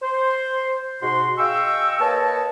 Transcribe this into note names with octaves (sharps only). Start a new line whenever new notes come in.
C5
G#2 B2 F#4 F#5 C6
G#4 D#5 F5 G5 C#6 E6
A#3 B4 C#5 D#5 A5